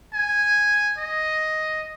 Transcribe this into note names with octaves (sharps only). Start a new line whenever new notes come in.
G#5
D#5